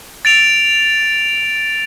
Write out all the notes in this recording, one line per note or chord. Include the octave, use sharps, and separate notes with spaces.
A6 D7 F7